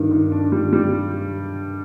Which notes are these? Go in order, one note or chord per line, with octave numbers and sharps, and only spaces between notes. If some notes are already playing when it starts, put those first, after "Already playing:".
Already playing: G2 D#3
D#3
D4
G3
G3